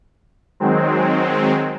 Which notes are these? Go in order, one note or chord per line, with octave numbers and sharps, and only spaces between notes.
D#3 F#3 G#3 C4